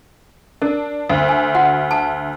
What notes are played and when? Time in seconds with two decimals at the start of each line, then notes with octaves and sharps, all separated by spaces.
0.62 D4 A#4
1.10 D2
1.29 G#5
1.55 F#4 F#5
1.91 A5